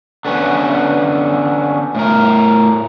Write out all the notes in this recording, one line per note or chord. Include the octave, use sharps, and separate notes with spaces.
D3 B3 C#4
A2 A#4